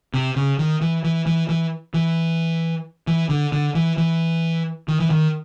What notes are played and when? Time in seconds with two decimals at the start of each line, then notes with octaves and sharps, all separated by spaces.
0.14 C3
0.36 C#3
0.59 D#3
0.81 E3
1.04 E3
1.26 E3
1.49 E3
1.94 E3
3.07 E3
3.29 D3
3.52 D3
3.75 E3
3.98 E3
4.88 D#3
5.00 E3
5.10 D#3